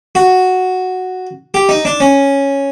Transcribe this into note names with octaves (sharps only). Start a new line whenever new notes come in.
F#4
G4
D#4
D4
C#4